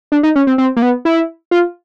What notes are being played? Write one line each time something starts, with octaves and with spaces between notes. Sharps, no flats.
D4
D#4
C#4
C4
C4
A#3
B3
E4
F4